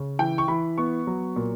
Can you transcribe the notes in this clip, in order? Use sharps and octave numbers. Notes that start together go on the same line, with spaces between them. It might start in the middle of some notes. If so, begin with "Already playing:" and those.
Already playing: C#3
E3 G5
C#6
E3 B5
B3 C#6
F#3
A#2